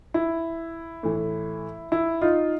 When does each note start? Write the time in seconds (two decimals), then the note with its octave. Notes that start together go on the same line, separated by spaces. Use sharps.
0.14 E4
1.03 A2 E3
1.92 E4
2.22 D#4 F4